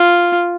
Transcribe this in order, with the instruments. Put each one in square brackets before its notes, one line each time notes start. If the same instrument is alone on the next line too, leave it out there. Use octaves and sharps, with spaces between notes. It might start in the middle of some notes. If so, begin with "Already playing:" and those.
Already playing: [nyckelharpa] F4